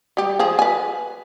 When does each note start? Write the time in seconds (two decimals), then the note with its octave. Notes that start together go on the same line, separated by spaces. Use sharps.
0.17 G3 G4
0.39 F3 G#4
0.59 B4 G#5